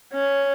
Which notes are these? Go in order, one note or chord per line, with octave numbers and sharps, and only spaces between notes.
C#4